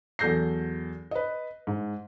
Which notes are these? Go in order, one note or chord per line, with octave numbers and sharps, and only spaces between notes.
E2 F#3 A4 G6 A#6 C7
B4 D#5
G#2